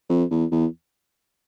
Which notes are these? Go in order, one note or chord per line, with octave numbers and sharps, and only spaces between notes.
F2
E2
E2